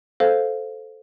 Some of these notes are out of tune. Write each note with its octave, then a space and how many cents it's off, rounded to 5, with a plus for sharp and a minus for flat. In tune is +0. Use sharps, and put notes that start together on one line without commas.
A4 +0 C5 -5 F5 +0